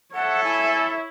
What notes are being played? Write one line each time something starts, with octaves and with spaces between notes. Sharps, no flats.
A4 C#5 E5 F#5
E4 G#5